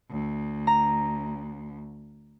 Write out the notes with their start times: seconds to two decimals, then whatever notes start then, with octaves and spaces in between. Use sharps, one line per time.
0.11 D2
0.67 A#5